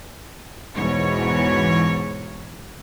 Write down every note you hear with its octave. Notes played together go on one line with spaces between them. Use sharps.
E2 G#2 B2 E3 C#5